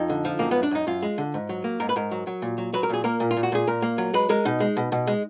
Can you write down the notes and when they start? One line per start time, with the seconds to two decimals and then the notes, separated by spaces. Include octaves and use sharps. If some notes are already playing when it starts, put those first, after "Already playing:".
Already playing: F2 D#4
0.10 D3
0.25 F3
0.39 F#2 A#3
0.51 F#2 B3
0.63 D4
0.71 F#2 D#4
0.87 F#2 F4
1.03 G#3
1.18 D3
1.34 G#2
1.49 F#3
1.64 A#3
1.80 G#2 A#4
1.89 B4
1.96 G#2 A#4
2.11 F#3
2.27 F#3
2.42 A#2
2.58 F#3
2.73 F#3 B4
2.83 A#4
2.90 A#2 G#4
3.04 A#3 A#4
3.20 A#2
3.31 F4
3.37 A#2
3.43 F#4
3.52 A#2 G#4
3.67 A#2 A#4
3.82 A#3
3.98 F#3
4.14 G#3 B4
4.29 G#3 A#4
4.45 B2 D#4
4.60 G#3
4.77 B2
4.92 B2
5.07 G#3